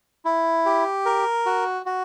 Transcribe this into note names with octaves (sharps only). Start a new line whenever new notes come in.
E4
G4
A#4
F#4
F#4